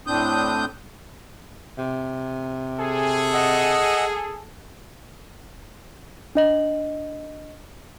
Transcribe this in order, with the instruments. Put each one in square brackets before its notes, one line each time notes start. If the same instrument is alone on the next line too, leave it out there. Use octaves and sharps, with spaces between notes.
[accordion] A2 C4 D4 D#6 G6
[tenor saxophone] C3
[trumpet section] G#4 A4
[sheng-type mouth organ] D#5 F#5 E6
[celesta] D4 D#5 F#7